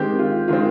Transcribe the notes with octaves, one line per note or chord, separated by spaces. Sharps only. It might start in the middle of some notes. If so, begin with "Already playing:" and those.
Already playing: D#3 G#3 C4 G4
F4
D#3 G#3 C4 F4